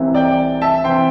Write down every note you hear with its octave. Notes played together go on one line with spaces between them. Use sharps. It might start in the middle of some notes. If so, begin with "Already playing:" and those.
Already playing: C2 C3 E3 C4
D5 G5
E5 A5
C3 E3 C4 G5 C6